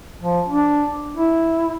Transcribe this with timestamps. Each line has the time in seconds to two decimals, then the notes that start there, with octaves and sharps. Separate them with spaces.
0.22 F3
0.49 D4
1.17 E4